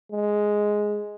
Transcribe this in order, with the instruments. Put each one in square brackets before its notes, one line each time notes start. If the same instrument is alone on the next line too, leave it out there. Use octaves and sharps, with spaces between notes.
[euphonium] G#3